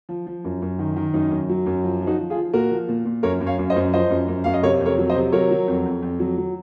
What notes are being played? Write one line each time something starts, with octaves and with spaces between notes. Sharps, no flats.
F3
F3
F#2
F#2
D#3
D#3
F#2 D#4
F#2
F#3
F#2
F3
F3
D#4 F#4
F3
F4 G#4
F3
A#2 F#4 A#4
F3
A#2
A#2
F#2 A#4 C#5
F#2
C#5 F5
F#2
C5 D#5
F#2
F3 C5 D#5
F#2
F#2
F#2 F5
D#5
C3 A#4 C#5
F2
A#4 C#5
F#3
C5 D#5
C3
F#3 A#4 C#5
F#3
F2
F2
F2
F#3
F#3